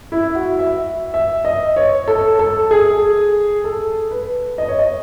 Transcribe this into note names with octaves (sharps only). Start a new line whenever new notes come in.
E4
F#4
E5
E5
D#5
C#5
A4
A4
G#4
A4
B4
D#5
C#5
D#5